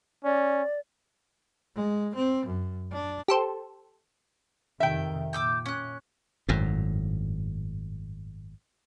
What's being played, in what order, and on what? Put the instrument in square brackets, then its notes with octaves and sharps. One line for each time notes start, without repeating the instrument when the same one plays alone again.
[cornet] C#4 [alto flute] D5
[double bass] G#3
C4
F#2
D4
[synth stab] G4 A4 C5
[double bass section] F2 C3 D#3 [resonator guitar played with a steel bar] E5 G5
[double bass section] A#2 [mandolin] D6 E6 G6
[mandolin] C#4 F#6
[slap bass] G#1 F#2 A2